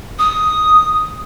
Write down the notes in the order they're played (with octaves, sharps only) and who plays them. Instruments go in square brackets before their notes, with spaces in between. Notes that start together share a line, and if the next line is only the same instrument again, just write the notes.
[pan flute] D#6